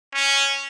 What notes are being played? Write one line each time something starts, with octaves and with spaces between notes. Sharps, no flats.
C#4